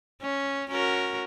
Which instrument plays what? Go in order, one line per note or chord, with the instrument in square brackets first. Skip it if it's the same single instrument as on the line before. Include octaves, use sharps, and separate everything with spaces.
[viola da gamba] C#4
C#4 F#4 A#4